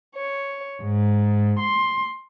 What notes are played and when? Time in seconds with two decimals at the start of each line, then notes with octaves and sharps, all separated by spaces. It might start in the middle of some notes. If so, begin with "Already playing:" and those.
0.15 C#5
0.82 G#2
1.59 C6